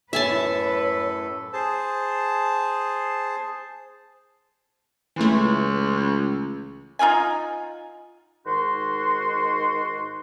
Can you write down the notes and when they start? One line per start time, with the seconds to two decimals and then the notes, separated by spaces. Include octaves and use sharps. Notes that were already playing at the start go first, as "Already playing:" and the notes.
0.13 F#2 A2 A4 B4 C#5 E5 G#5 A5
1.53 G#4 C5 A5
5.16 C#2 E3 A3
6.99 D#4 F4 F#5 G#5
8.46 G#2 D#3 D#4 F#4 C6